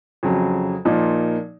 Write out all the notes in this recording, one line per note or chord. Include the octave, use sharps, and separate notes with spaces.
F2 C#3 F#3
A#2 F3 A#3 D#4